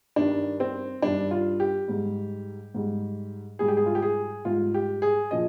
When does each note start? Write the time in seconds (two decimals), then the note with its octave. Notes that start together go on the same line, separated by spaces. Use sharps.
0.16 G2 D#3 G3 D4
0.60 C4
1.02 G2 D#3 G3 D4
1.31 F4
1.60 G4
1.88 G#2 G3
2.74 G#2 G3
3.59 G#2 G3 G#4
3.68 G4
3.77 G#4
3.86 F4
3.95 G4
4.02 G#4
4.45 G#2 G3 F4
4.74 G4
5.02 G#4
5.31 A#2 F3 D#5